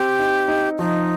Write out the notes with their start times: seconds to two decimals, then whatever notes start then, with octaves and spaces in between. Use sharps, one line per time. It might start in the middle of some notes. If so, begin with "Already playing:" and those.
Already playing: C4 G4
0.19 D#4
0.48 D#4
0.78 F3 D#4